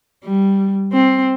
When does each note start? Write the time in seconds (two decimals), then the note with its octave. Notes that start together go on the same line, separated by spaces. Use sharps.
0.24 G3
0.93 C4